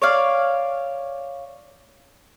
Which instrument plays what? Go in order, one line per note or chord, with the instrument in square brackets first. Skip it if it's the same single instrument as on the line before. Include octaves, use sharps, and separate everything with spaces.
[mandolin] C#5 D5 F5